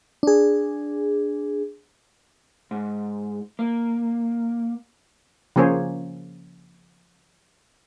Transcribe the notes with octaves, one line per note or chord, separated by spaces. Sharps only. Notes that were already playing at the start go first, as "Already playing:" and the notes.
D4 G#4
G#2
A#3
C#3 F3 A#3 G#4 C5 C#5